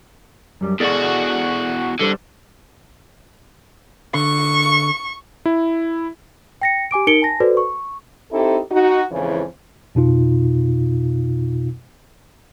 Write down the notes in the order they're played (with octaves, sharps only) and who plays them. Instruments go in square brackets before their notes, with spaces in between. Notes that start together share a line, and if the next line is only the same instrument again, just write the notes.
[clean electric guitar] F#2 G3
[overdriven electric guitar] E2 F#4 [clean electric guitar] G#4 A4 D5
[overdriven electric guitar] D3 [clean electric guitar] G3 A4 C5
[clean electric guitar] D3 [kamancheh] C#6
[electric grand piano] E4
[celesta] G5 A#6 C#7
G4 G#5 D6 D7
D#4 A#4 C#7 D7 G7
G#5 A5 A#6
F#4 A4 B4 C5 D5
C#6
[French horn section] C4 D#4 E4 G4 A4
D#4 F#4
F2 G#2 C#3 E3
[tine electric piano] F2 B2 D#4 F4